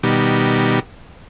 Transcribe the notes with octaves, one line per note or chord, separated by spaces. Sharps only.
B2 D#3 G3